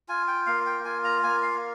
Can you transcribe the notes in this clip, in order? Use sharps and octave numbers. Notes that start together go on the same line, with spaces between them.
F4 G#5
G5
A#3 F5
G5
F4 G#5
A#5
A#3 G#5
F5